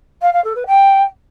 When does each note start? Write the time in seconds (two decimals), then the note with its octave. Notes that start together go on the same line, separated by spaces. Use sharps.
0.22 F5
0.33 F5
0.44 A4
0.55 B4
0.67 G5